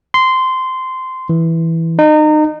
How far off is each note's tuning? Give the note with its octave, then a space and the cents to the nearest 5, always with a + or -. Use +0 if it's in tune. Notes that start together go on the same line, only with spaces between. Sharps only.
C6 -15
E3 -5
D#4 -30